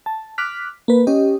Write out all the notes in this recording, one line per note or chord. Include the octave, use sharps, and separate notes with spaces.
A5
D6 F6 F#6 B6
A#3 B4
C#4 G4 D#5